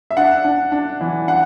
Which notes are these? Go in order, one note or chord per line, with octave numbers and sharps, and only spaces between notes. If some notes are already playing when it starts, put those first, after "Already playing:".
E5
D4 F#5
D4
D4
E3
D4 F#5